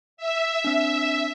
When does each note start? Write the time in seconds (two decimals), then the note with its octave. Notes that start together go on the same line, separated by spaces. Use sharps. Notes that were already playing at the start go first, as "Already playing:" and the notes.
0.17 E5
0.64 C4 D4